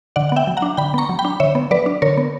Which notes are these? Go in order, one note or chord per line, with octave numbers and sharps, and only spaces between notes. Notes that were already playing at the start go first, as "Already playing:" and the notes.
D3 D5 F#5
F#5
B3 E5 G5
F#3
F#5 A#5
D4
D3 G5 B5
B3 A#5 C#6
F#3
G5 B5
D4
D3 C#5 E5
B3
F#3 B4 D5
D4
D3 A#4 C#5
B3